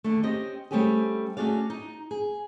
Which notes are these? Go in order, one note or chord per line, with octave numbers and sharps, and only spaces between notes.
D#2 D3 A3
C4 C#4 G4 D#5
G3 A3 C4 C#4 G4 G#4
A3 C#4 F#4 G#4 D5 F5
D#4
G#4